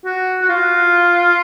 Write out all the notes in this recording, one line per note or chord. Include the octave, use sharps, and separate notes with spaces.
F#4
F#4
F4